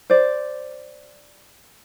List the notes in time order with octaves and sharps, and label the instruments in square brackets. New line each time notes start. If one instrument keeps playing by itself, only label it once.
[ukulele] C5 D5